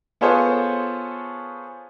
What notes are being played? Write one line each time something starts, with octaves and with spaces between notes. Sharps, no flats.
B3 F4 G#4 A4 C5 C#5